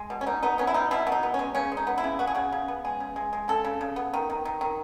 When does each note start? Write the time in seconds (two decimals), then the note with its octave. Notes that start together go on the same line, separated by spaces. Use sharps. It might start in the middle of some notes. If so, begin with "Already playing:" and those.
Already playing: G#3
0.10 B2
0.21 C#4
0.26 B2 D#4
0.43 B3 D#4
0.58 B3 C#4
0.67 E4
0.74 B2 D#4
0.91 B2 E4
1.07 B2
1.12 D#4
1.23 B3
1.34 C#4
1.39 G#3
1.55 C#3 C#4
1.72 G#3
1.77 D#4
1.87 B3
1.98 E4
2.04 C#3
2.19 B3 F#4
2.27 G#4
2.35 C#3 F#4
2.52 C#3
2.68 B3
2.85 G#3 G#4
3.00 C#3
3.16 G#3
3.33 G#3
3.48 C#3 A4
3.64 C#3
3.81 C#3
3.96 B3
4.14 D#3
4.30 D#3
4.45 D#3
4.61 D#3